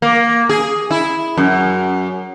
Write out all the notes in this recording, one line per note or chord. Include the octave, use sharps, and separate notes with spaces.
A#3
G#4
E4
F#2